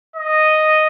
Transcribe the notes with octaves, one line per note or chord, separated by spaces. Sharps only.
D#5